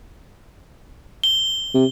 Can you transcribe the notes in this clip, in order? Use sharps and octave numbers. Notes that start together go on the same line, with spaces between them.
G7
C3